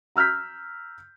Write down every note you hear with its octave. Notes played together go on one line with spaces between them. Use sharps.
A#5 E6 F6 G6 B6